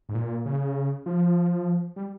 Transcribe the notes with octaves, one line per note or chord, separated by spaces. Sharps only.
G#2
A#2
C#3
F3
G3